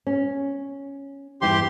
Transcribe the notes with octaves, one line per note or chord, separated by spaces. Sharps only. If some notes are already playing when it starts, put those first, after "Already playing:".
C#4
E2 G2 E4 G4 C6